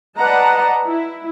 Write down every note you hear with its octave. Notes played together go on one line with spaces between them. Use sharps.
B4 D5 D#5 F#5 A5 A#5
E4